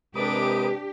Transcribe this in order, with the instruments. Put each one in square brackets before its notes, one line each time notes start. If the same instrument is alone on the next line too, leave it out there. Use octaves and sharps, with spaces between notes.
[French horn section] C3 G#3 [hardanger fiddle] D4 D6 [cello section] G4 [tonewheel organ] A#4 B4 D#6